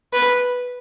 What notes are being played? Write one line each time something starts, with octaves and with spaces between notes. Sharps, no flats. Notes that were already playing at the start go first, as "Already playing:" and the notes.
B4